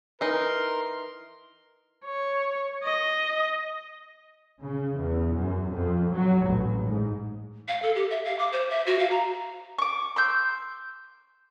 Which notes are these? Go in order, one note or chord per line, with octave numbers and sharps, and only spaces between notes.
E3 D#4 A#4 C6
C#5
D#5
C#3
E2
F#2
F2
F#3
A1
G#2
F5
A4
G4
E5
F5
D6
C5
E5
F#4
F5
A#5
C#6 D6
C6 E6 G6